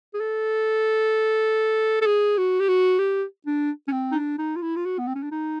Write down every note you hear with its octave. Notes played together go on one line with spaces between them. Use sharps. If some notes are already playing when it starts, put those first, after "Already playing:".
G#4
A4
A4
G#4
F#4
G4
F#4
G4
D4
C#4
C4
D#4
D4
D#4
F4
E4
F4
F#4
B3
C4
C#4
D4
D#4